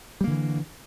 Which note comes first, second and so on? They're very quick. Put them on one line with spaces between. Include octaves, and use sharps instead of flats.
G3 A#3 D3 E3